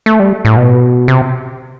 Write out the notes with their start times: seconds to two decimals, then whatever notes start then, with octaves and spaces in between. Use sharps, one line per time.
0.06 A3
0.20 G3
0.45 A2
0.57 B2
1.08 C3